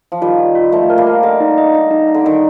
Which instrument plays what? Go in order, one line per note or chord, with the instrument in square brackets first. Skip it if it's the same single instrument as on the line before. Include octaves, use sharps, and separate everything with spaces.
[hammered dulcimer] F3
[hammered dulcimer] D#3 G3 [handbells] F4
[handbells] F4
F4
[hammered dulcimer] F3 A3 [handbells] F4
[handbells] A#4
[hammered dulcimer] G3 A#3
[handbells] A#4
[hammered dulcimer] D3 [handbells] D#5
[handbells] D#4
D#5
D#5
D#4
D#4
[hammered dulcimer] D3
[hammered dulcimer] D#3 [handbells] D#4